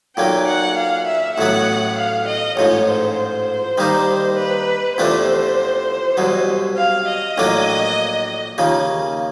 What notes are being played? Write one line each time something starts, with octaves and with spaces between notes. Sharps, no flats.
B1 A#2 F#3 A#3 G5
F#5
F5
E5
A1 A2 F#3 B3 F#5
F5
D#5
A1 G#2 F3 C#5
C5
C5
D#3 G3 A#3 D#4
B4
E2 C3 F3 A3 D4 C5
C2 B2 F#3
F5
D#5
A#1 A2 F#3 A#3 D4
D#2 C#3 F3 A#3